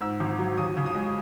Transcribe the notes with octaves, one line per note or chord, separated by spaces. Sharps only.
G#2 E6
G#1
F#3
D#2 D#6
C#3
D#6
G#3